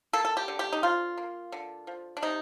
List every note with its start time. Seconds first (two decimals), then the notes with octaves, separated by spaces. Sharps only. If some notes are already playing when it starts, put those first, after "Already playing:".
0.13 A#3 A4
0.25 A4
0.37 G4
0.48 D3
0.59 G4
0.73 D#4
0.83 F3 F4
1.17 A#3
1.52 D3
1.87 F3
2.17 D4
2.22 C3 D#4